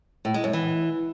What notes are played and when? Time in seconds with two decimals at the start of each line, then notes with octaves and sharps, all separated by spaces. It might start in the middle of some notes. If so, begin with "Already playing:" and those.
0.25 A2
0.34 G#3
0.44 F#2
0.53 E3